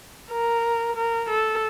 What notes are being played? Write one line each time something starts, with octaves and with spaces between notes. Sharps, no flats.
A#4
A#4
A4